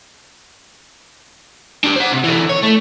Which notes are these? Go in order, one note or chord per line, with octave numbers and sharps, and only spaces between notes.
D4 G4
C5 F#5
C3
D3 E3
C#5
A3